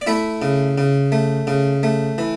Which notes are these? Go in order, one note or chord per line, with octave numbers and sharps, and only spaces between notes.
D5
A3 E4 E5
C#3
C#3
A3
C#3
A3
E3